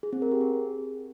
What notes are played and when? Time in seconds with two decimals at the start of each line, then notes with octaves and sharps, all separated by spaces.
0.03 G#4
0.13 C4
0.22 A#4
0.31 G4
0.41 G#4